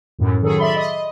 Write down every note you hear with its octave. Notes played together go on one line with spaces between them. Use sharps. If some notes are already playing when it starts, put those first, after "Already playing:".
F#2 A2
D#3 F#3 G#4 A4
D5 E5 B5 C6
D#5
D#5